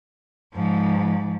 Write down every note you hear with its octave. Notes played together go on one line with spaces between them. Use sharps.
G#2 F3